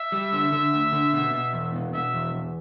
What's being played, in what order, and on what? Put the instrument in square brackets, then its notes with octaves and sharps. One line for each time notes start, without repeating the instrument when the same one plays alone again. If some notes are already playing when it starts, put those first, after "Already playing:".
Already playing: [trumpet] E5
[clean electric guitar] G3
D3
D3
D2
D3
B2
B2
E2
B2
[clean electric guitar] B2 [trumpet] E5
[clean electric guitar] E2
E2